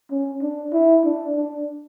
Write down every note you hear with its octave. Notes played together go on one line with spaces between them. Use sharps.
C#4
D4
E4
D4
D4